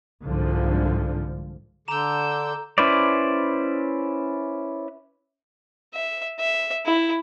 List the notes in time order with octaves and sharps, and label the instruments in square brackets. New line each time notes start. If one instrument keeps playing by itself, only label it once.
[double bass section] C2 G#2 D3 F3
[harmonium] D3 [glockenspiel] A#5 E7 [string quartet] D6 E6 G6
[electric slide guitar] C#4 E4 B4 C5 D5
[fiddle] E5
E5
E4